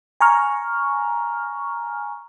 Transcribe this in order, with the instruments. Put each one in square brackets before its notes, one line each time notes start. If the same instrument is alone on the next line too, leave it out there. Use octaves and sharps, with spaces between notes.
[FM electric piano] G#5 A#5 C#6 F6